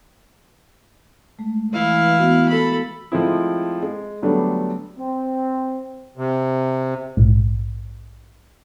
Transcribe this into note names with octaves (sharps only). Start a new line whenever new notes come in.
G#3 A3
E3 E4 F5
B3 F#4
A4 B5
F3 G#3 A3 C4 E4
G#3
D3 F#3 G3 A3 B3 D4
C4
C3
A#1 G#2